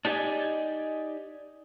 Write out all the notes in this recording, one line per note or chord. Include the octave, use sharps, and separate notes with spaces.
D4 D#4 G4 D5 D#5 G#5